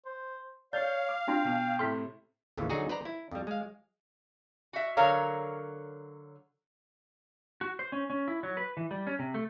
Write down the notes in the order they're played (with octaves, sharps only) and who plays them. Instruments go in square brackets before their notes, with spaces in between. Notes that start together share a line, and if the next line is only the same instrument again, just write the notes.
[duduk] C5
[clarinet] C#5 [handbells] D5 [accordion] F5 [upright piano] G6
[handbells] D6
[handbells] C4 D4 F4 [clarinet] G5
[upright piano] B2
[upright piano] A2 C3 [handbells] C6 F6 B6
[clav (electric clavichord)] A1 D#2 C#3 E3
D3 F#3 D#4 F#4 G#4
B4 C5 D5 A#5
E4
F2 G3
G#3 F5
[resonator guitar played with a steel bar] F#4 E5
D3 F#3 A#4 C#5 F5 A#5
[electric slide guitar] F#4
C5
C#4
C#4
E4
F#3
B4
E3
G3
C#4
C3
A3